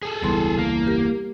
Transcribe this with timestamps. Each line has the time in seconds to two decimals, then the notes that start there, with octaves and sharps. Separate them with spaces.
0.03 G#4 A4
0.22 E1 C#2 E3 G3 B3 C6
0.58 A#3
0.87 G4 A#4